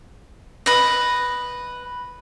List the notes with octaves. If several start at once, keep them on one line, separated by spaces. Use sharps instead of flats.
B4 D#5